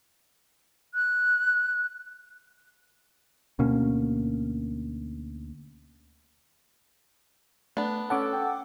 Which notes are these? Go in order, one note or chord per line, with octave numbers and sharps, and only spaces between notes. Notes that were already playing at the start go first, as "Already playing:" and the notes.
F#6
D2 B2 A#3 C#4
A3 B3 D4
C#4 A4 C#5 F#5 A5 D6
G5